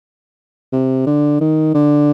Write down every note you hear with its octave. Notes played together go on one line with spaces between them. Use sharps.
C3
D3
D#3
D3